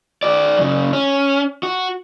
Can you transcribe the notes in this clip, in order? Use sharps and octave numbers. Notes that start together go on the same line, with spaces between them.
F#4 D5
F#2 C#3
C#4
F#4